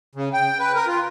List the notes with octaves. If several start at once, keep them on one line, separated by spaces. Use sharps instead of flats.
C#3
G5
B4
A#4
F4